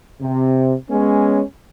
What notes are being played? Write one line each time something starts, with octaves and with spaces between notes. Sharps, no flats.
C3
G#3 B3 C#4